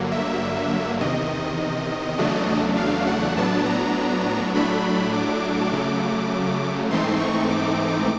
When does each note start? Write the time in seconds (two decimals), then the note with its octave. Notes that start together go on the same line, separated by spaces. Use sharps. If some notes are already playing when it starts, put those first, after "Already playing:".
Already playing: G2 D3 F#3 A#3
0.12 E5
1.00 E2 C3 D#3 D#5
2.18 E2 C#3 F#3 A3 D4
2.77 F5
3.07 F#5
3.36 A2 F#3 B3 D4 A5
3.65 A#5
4.54 A2 F#3 A3 D4 B5
5.13 D6
5.72 C#3 F#3 A3
6.90 G#2 E3 A3 C4 D#4 C6
7.20 C#6
7.50 D6